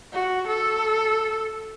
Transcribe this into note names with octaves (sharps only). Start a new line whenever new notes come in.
F#4
A4